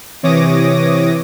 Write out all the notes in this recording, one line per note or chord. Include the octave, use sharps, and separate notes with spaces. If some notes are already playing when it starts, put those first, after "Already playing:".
C3 E3 C#5 D6 D#6 A#6